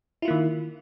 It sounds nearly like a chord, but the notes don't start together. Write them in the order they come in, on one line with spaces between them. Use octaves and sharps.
E4 F4 A#3 D#3